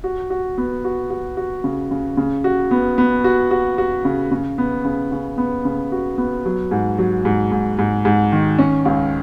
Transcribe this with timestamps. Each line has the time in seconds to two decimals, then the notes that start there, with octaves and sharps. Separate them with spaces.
0.04 F#4
0.30 F#4
0.58 B3
0.84 F#4
1.10 F#4
1.37 F#4
1.64 C#3
1.91 C#3
2.17 C#3
2.44 F#4
2.71 B3
2.98 B3
3.24 F#4
3.51 F#4
3.78 F#4
4.05 C#3
4.31 C#3
4.58 B3
4.84 C#3
5.12 C#3
5.38 B3
5.65 C#3
5.92 F#4
6.18 B3
6.45 F#3
6.71 G#2
6.99 F#3
7.25 G#2
7.52 G#2
7.79 G#2
8.05 G#2
8.32 D#3
8.59 C#4
8.85 C#2